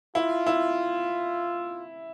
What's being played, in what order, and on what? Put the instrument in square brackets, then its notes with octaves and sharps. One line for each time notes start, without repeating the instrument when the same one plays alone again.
[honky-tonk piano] E4 [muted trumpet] F4
[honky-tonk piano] E4